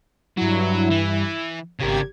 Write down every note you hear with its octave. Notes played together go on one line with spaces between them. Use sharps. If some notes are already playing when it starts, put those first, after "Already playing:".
G2 F#3 E4
E3
G#1 C#3 G4 A#4 G#6